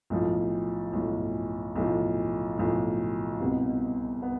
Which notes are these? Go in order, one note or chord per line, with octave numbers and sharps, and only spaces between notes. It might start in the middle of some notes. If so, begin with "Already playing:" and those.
B1 A2 F3
B1 A2 F3
B1 A2 F3
B1 A2 F3
C2 B2 B3
B3